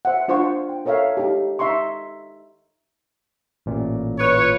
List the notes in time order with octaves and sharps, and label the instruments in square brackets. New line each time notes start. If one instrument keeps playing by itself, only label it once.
[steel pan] C5 E5 F#5
D4 F4 C5 F#5 C#6
G5
A4 A#4 C#5 E5 F5
D#4 G4
D#4 E5 A#5 C6 C#6
[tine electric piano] A1 A#2
[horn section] F4 B4 C#5